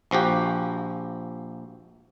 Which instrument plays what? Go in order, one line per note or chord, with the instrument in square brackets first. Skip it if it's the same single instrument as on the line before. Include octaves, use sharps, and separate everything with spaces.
[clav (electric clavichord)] A#1 F3 F#4 G4